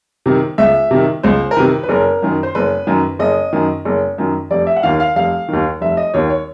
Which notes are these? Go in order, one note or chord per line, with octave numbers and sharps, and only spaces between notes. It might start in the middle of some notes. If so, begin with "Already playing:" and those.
C3 D#3
C#2 E5
C3 D#3
C#2 C5
A#4
C3 D#3 B4
B4
F#1 A#4
F#2 D#3
C5
F#1 B4
F#2 D#3
F#1 D#5
F#2 D#3
F#1
F#2 D#3
F1 D5
E5
F#5
D#2 D#3 F5
F5
F1 F5
D#2 D#3
F1 E5
D#5
D#2 D#3 C#5
C#5